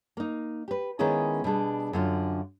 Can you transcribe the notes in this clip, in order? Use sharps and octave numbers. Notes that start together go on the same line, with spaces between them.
A#3 D#4
G4 B4
D#3 G#3 B3 C#4 E4 G#4
B2 G3 D4 G#4
F#2 D3 F4